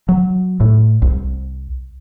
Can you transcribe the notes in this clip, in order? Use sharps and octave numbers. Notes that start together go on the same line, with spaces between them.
F#3
A2
C2